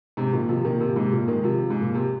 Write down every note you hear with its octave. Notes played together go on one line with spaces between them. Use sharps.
G#2 C3
A#2 D#3
C3 F3
A#2 D#3
C3
A#2
G#2 C3
A#2
D#3 G#3
C3 F3
G#2
A#2
C3